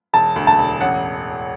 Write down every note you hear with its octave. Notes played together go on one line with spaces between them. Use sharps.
E1 A5
D2
A5
E1
A1 F#5